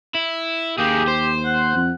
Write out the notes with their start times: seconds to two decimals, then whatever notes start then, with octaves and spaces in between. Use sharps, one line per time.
0.15 E4
0.78 D#2 A#3 G4 G#4
1.07 C5
1.46 F#5
1.75 F2